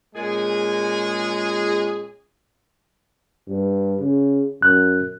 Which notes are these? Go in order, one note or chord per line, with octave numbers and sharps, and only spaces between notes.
A#2 G#3 C#4 G#4
G2
C#3
F#2 F#6